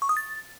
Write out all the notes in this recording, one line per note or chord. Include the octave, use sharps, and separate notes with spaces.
C#6
D#6
A6